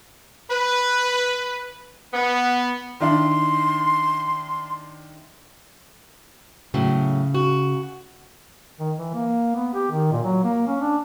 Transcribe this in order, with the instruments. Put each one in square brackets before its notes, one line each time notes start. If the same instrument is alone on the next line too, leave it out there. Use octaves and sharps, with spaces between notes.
[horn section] B4
B3
[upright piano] D#3 D4 E4 [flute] C6
[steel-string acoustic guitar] A2 F#3 [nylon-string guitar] C#3
[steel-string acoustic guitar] F#4
[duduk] D#3
E3
A#3
B3
G4
D#3
A#2
F#3
A#3
C#4
D4